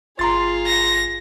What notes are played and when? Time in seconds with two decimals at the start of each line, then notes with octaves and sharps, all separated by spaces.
0.19 G1 F4 G#4 A#5 C6 A6
0.67 A#6